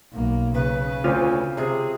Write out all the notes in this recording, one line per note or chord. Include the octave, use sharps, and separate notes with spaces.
B1 A#3
C#3 B4
D2 C4 C#4 F4
C3 G#4